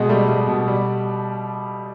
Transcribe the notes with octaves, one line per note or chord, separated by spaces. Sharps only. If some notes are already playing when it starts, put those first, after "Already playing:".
Already playing: B2 G#3
G3 A3
G3
B2
G3